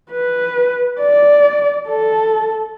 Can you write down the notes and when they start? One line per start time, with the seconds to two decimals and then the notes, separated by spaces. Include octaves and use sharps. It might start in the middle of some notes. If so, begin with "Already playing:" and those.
0.12 B4
1.00 D5
1.88 A4